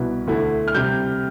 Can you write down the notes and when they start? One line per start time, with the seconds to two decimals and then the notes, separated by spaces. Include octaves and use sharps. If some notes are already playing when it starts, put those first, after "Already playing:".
Already playing: C2 B2 B3 E4
0.27 D2 D3 A3 E4
0.68 F6
0.74 C3 G3 G6